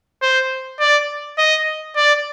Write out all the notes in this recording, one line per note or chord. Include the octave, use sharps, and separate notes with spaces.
C5
D5
D#5
D5